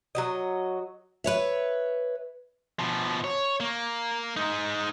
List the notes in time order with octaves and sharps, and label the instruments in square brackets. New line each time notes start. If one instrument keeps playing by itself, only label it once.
[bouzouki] F#3 F#4 D#5
[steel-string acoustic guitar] B4 C#5 E5
[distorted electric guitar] B2 F3
C#5
A#3
G#3 D#4